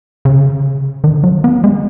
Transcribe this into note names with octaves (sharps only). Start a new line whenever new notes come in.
C#3
D#3
F#3
B3
G#3